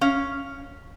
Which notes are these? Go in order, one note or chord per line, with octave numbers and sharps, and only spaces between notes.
C#4 F5